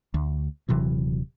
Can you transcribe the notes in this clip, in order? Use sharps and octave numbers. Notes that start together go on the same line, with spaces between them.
D2
D#1 C3 E3 F#3